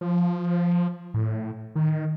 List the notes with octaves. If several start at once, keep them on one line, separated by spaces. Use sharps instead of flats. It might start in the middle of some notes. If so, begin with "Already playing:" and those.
F3
A2
D#3